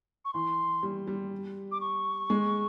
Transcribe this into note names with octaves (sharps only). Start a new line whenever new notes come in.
C#6
E3 C6
G3
G3
D6
C#6
G#3